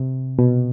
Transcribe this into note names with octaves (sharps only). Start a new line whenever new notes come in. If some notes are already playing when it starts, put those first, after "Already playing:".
Already playing: C3
B2